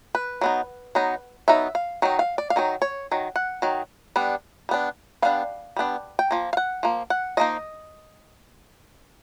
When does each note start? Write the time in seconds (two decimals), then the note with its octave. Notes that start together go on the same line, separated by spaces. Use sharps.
0.15 B4
0.41 F#3 B3 D#4
0.95 F#3 B3 D#4
1.48 F#3 B3 D#4 E5
1.75 F5
2.02 D#3 F#3 D#4
2.19 F5
2.38 D5
2.50 F5
2.56 D#3 F#3 D#4
2.82 C#5
3.11 D#3 F#3
3.36 F#5
3.62 D#3 F#3
4.16 G3 B3 D4
4.69 G3 B3 D4
5.22 G3 B3 D4 F5
5.76 G3 B3 D4
6.19 G5
6.31 F3 A#3
6.53 F5
6.57 F#5
6.83 F3 A#3
7.10 F#5
7.37 F3 A#3 D#4 D#5